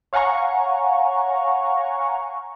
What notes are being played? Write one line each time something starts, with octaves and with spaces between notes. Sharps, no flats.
C#5 F5 F#5 G#5 A#5 C#6